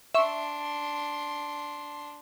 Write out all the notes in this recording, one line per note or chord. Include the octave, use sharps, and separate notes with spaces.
D4 E5 C6 C#6